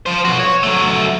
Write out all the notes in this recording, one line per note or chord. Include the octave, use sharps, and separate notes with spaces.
F3 C5
B1 F#4
C#5
F#3 A3